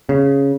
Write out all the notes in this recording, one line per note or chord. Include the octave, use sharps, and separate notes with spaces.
C#3